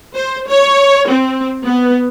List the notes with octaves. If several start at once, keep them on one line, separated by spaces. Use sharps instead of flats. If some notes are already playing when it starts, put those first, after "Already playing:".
C5
C#5
C4
B3